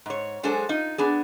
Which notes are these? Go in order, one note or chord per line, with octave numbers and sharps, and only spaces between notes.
G#2 C#5
F#3 G#3 D4 G#4 A4 C5
D#4 F4
B3 D4 G#4